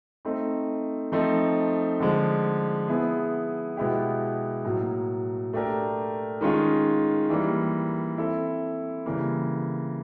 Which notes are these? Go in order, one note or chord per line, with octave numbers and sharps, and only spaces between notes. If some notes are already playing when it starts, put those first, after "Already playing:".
A3 C4 D#4
F3 A3 C4 D#4
D3 F3 G#3
B3 E4 G#4
B2 G#3 B3 E4 G4
A2 F#3 A#3
A3 D4 G4 A#4
D#3 G#3 C#4 F4 G#4
E3 G3 A#3
C4 E4 A4
C#3 E3 G3 A#3